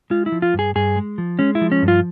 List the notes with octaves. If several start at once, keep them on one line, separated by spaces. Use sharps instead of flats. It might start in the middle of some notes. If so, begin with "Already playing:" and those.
G#3 F4
E4
F3
F4
G2
G#4
G2 G#4
G#3
F3
G#3 C#4
E4
F3
C#4
G2
F4